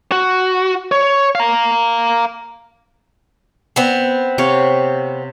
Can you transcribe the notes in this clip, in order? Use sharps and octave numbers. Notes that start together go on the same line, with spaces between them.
F#4
C#5
F5 A#5
B3 C4
C3 C#5 F5